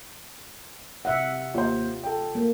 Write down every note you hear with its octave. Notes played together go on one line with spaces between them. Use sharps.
C3 E5 F#5
D#2 F4 C5
A4 G5
A#3